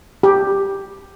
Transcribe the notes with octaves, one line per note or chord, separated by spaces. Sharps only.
G4